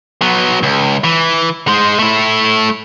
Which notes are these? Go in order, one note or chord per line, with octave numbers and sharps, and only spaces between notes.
F#3 B3
C#2
E3
G#3 C5
A3 E4